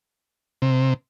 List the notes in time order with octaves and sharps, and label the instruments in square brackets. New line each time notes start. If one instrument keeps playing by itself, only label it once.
[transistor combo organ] C3